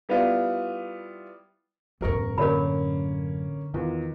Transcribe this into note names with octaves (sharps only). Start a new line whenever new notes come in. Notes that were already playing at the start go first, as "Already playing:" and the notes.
G3 B3 E4 F4
E1 A1 F#2 A#4 C#6
D3 A#3 C#4 A#4 C#5 B5
E2 D#3 F4